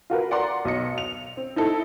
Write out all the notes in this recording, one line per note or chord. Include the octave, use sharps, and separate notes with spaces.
F4 F#4 A#4 B4
D5 F#5 A#5 C6
B1 D#5 C#7
F7
C4
D#4 E4 A4